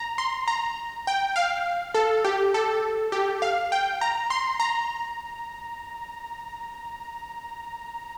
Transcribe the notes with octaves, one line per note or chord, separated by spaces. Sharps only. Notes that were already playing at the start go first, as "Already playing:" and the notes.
Already playing: A#5
C6
A#5
G5
F5
A4
G4
A4
G4
F5
G5
A#5
C6
A#5